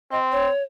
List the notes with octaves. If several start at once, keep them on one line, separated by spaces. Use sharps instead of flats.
C4 D#5
C#5